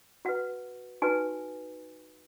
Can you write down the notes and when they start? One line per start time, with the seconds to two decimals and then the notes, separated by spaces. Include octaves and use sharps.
0.25 F#4 B4 F#5
1.02 D#4 F#4 B4 G#5